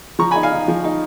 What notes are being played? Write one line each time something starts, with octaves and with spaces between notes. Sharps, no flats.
F3 A#5 C#6
D#4 G#5 B5
F5 G#5
D#4
F3
D#4